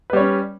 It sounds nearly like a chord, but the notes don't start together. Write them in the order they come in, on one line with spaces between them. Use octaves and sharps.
B4 G3 C#5 C#4